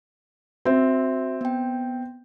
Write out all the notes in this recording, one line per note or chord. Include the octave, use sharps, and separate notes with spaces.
C4 F#4 E5
B3 G5